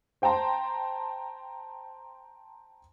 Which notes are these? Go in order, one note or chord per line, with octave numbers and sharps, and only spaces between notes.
C5 G5 A5 A#5 C6